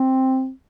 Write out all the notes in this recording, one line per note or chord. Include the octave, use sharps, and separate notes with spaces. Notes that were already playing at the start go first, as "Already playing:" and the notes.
Already playing: C4